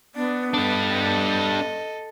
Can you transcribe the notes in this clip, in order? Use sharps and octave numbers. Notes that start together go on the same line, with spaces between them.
B3 D4
G3 D4 A4 D#5